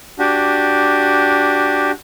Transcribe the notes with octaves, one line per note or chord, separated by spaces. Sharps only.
D4 F#4 G4